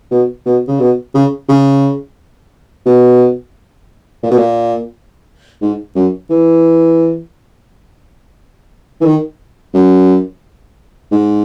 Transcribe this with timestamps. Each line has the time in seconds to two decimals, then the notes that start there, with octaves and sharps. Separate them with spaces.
0.11 B2
0.46 B2
0.68 C#3
0.79 B2
1.14 C#3
1.48 C#3
2.86 B2
4.23 A#2
4.31 B2
4.38 A#2
5.61 G#2
5.95 F#2
6.30 E3
9.01 E3
9.05 D#3
9.74 F#2
11.11 G#2